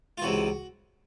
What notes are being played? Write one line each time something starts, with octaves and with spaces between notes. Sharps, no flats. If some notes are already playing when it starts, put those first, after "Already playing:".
F4
C#2 C3 E3 F#4